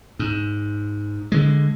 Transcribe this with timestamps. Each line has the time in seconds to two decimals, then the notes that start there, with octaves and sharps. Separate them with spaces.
0.19 G#2
1.32 D3 G#3